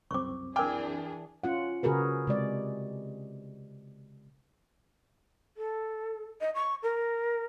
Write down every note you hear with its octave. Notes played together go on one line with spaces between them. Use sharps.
C2 F#2 C4 C#6 D6
E3 D4 G#4 A#4 G5 G#5 D6 F6
C#4 F4 F#5
C#3 F#4 G#4 A#4 B4
C3 G#3 D5
A4
D#5
C#6
A#4